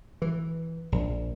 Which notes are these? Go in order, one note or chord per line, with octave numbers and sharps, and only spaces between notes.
E3
A#1